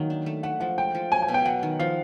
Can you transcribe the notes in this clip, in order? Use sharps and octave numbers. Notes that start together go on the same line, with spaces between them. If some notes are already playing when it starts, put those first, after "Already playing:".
Already playing: D#3 F#3 A#3
D4
A3
A3 F#5
F3 F#5
G#3 G5
F3
F#3 G#5
G#5
B2
G5
F#3 F#5
D#3
F3 F5